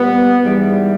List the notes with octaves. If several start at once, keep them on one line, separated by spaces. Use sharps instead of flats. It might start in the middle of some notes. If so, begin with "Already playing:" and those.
Already playing: A#2 G3 B3
G#2 E3 G3